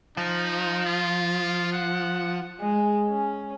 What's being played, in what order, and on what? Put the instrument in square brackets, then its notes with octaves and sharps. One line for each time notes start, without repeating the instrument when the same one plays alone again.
[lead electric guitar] F3 [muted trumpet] D#4
[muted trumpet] F4
F#5
[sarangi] G#3
C#4